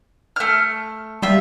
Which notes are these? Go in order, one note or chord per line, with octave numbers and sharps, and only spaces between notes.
A3 F6
G3 F4 E5